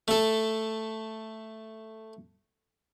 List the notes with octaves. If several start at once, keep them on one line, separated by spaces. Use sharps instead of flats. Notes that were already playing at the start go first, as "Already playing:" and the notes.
A3 A4